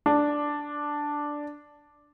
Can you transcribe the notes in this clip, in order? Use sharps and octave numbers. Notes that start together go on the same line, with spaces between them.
D4